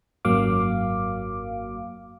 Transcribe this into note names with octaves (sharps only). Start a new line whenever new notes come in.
G#1 F#2 F#3 A#3 F5 D6